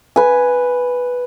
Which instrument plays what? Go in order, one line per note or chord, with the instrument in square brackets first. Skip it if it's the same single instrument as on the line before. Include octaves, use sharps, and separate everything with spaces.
[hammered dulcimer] B4 G#5